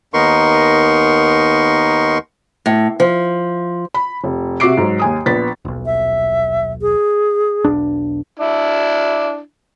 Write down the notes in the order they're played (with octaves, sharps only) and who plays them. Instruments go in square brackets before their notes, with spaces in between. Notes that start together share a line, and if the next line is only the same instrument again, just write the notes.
[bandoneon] D#2 B3 D#4 A#4 C6 C#6
[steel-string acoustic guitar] A2
F3
[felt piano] B5
F1
C3 F#4 E5 D6 C7 D7
G#2 F#3
D#2 G#5 D#6
A#1 B3 A6 B6
[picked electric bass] D#1 B1
[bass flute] E5
G#4
[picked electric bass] E1 B1 D4
[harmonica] D4 E4